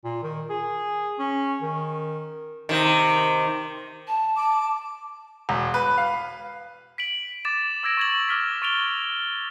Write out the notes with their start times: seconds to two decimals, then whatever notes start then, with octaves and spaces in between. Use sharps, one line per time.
0.04 A#2
0.23 D#3
0.50 G#4
1.19 C#4
1.62 D#3
2.69 C3 D#3
4.08 A5
4.36 D6
5.49 E1
5.74 B4
5.98 F5
6.98 B6 D7 F#7
7.45 D6 A6 E7
7.83 D6 E6 G#6 A#6 D7
7.97 C#6 G#6 F#7
8.29 D6 F6 B6
8.62 C#6 A6 D7 F7 G7